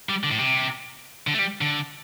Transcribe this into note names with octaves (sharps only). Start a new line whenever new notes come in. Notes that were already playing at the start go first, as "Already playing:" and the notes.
G3
D3
A2
C3
D3
A3
G3
D3